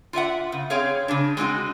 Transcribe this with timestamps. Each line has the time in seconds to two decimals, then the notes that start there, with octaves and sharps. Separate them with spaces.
0.13 F4 D5 E5 F#5
0.52 C#3
0.70 C4 G#4 C#5 F5
1.08 C#3 D4
1.37 G#3 C4 D#4 F#4